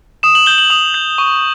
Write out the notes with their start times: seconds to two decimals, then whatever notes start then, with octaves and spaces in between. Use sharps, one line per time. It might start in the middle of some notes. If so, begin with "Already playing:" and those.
0.23 D#6 E7
0.35 F#7
0.46 G6 G7
0.58 F#7
0.70 D#6 F7
0.94 G6
1.18 C#6